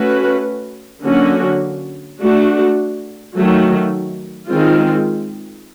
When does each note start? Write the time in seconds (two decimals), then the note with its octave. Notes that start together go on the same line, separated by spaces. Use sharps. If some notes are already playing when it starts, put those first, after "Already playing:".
Already playing: A3 C#4 F#4 B4
1.05 D3 F#3 A#3 C#4 F#4
2.20 A3 D4 F#4
3.34 D#3 F#3 A3
4.49 D#3 G#3 C4 F4